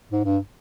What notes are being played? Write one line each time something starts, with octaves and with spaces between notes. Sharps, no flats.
G#2
G2